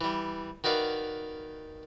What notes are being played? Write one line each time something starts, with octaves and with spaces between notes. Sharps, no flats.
E3 G3
D#3 F#4 B4 D5 F5